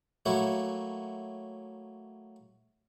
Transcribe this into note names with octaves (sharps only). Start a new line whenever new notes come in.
F#3 A3 A#3 E4 F#4